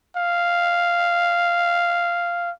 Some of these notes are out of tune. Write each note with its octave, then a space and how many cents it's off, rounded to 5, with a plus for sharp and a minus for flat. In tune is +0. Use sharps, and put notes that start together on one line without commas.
F5 -5